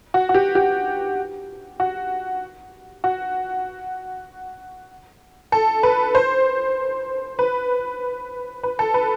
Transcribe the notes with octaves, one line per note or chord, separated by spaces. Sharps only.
F#4
F#4
G4
G4
F#4
F#4
A4
B4
C5
B4
B4
A4
B4